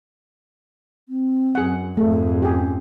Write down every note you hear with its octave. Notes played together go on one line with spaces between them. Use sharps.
C4
F#2 G#4 F#5
F2 G#2 A3 G#4
C#4 G4 G#4